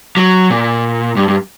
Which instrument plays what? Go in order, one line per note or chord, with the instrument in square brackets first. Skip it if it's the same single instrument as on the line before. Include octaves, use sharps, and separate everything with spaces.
[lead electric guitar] F#3
A#2
G2
G2